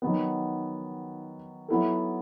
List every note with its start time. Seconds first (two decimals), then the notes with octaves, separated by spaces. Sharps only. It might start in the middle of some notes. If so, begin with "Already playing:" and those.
0.02 D#3 F#3 B3
1.68 F#3 B3 E4 A4